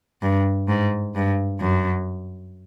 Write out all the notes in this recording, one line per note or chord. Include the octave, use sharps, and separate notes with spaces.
G2
G#2
G2
F#2